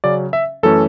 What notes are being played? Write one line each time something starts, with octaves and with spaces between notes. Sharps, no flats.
C#3 F#3 C#4 D5
E5
F#2 E3 A3 C#4 A4